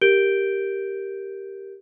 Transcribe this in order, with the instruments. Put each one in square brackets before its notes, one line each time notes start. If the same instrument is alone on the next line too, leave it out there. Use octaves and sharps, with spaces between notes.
[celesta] G4 A#4 G6 D7 G7